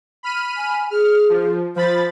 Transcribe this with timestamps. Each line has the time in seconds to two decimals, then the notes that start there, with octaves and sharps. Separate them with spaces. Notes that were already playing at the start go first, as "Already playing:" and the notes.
0.23 B5 F6 D#7
0.57 G#5
0.91 G#4 F6
1.30 F3
1.76 F3 C5 B5 A6